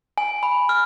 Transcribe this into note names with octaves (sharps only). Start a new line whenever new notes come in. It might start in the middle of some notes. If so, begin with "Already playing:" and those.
G#5
B5
F6